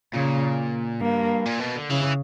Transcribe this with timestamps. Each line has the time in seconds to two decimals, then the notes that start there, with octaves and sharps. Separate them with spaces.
0.13 A#2 C#3
1.01 G2 A#3
1.45 A#2
1.60 B2
1.75 D3
1.90 C#3 E3